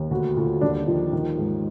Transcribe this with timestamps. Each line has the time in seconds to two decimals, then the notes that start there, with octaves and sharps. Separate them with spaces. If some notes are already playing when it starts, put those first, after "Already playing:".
Already playing: D#2
0.10 D2 F#4
0.37 D2 F4
0.61 D#2 D4
0.87 D#3 F3
1.13 D#3
1.38 G#2